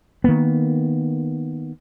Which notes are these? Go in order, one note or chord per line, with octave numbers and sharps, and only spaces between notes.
D#3 A#3 B3